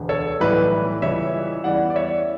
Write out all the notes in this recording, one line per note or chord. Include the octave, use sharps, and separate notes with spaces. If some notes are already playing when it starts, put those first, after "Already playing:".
Already playing: E1 D2 D3
A4 C#5
B1 A2 E3 G3 B4
C#2 C#3 E3 G3 C#5 E5
E2 C#3 E3 G3 D5 F#5
D5
C#5 E5